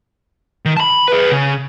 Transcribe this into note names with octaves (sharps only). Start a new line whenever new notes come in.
D#3
A5 B5
G#4 B4
C#3